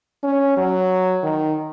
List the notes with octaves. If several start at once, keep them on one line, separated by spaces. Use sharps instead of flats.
C#4
F#3
D#3